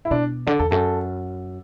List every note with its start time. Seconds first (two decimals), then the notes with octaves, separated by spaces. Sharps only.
0.05 E4
0.11 B2 D4
0.47 D3 D4
0.59 E2 A4
0.71 F#2 A4